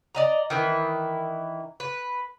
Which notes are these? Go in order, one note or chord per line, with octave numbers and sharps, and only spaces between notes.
D5 D#5 A#5
D#3 E3 E4
B4